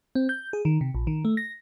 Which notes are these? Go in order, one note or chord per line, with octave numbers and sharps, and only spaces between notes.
C4
G6
G#4
D#3
C3
A#1
D#3
A3
A#6